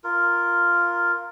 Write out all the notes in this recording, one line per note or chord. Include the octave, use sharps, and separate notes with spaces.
F4 A#4